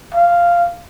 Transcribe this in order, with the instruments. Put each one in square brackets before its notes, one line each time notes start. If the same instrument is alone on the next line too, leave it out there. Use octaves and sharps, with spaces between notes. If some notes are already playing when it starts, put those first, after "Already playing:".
[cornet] F5